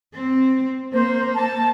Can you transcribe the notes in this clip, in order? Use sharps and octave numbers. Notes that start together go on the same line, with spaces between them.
C4
A#3 C5
A5